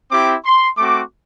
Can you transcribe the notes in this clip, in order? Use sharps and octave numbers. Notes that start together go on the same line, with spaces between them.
C4 E4 G4 D6
C6
A3 C4 F#4 D6